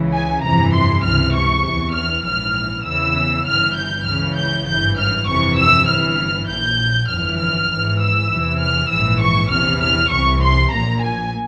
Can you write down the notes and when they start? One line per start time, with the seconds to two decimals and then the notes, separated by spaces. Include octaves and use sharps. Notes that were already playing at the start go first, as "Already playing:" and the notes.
Already playing: C#2 C#3 E3
0.13 G#5
0.44 G1 F2 C3 E3 A#5
0.74 C6
1.04 C#2 C3 E3 F6
1.35 C#6
1.65 E2 E3
1.95 F6
2.25 A#1 G#2 E3 F6
2.86 E2 C#3 E3 E6
3.46 G1 G2 E3 F6
3.77 G6
4.07 C#2 C#3 E3 F6
4.37 G6
4.68 G#1 G2 E3 G6
4.99 F6
5.28 G1 F2 C3 E3 C#6
5.59 E6
5.88 G1 G2 E3 F6
6.49 A#1 A#2 G6
7.10 G1 F2 E3 F6
7.39 F6
7.70 G#1 G#2 E3
8.00 E6
8.31 E2 C3 E3
8.60 F6
8.91 A#1 G#2 E3 E6
9.22 C#6
9.52 E2 C3 E3 F6
9.82 F6
10.12 C2 C3 E3 C#6
10.43 C6
10.73 A#1 A#2 A#5
11.03 G#5